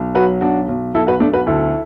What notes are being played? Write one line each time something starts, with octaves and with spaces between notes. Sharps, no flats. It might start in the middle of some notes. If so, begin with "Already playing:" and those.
Already playing: B1
F#3 F#4 B4
B1 D4 F#4
B1
B1 E4 A4
F#4 B4
B1 A3 D4
F#4 B4
D2 E4 A4